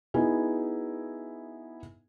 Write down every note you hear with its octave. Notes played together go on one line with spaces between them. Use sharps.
B3 D#4 E4 F#4 G#4 G#5